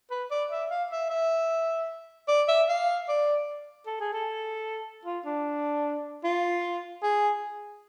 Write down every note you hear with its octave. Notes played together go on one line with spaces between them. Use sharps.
B4
D5
E5
F5
E5
E5
D5
E5
F5
D5
A4
G#4
A4
F4
D4
F4
G#4